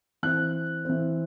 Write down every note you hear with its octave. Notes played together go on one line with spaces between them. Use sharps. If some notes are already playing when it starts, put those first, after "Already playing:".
E3 C4 F#6
E3 C4